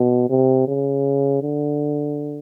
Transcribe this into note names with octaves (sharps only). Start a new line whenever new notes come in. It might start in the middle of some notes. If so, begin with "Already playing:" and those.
Already playing: B2
C3
C#3
D3